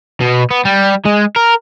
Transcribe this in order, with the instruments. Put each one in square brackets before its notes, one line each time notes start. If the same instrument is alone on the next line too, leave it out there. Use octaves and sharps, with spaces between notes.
[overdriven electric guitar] B2
B3
G3
G#3
A#4